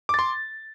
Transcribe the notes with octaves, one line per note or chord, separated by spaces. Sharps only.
C6 D6 A6